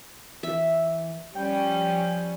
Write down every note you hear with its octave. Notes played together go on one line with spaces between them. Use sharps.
E3 E5
F3 G3 C#4 G5